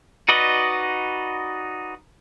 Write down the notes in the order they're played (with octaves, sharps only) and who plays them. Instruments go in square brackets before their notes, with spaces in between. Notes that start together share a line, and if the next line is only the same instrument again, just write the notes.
[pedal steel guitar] D#4 F#4 B4 D5 D#5